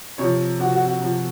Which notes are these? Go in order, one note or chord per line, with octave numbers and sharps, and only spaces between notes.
C3 F3 C#5
C3 F3 F#4
F#4
F#4
C3 F3